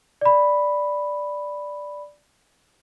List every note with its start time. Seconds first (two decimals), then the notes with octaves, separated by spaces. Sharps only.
0.21 D5 B5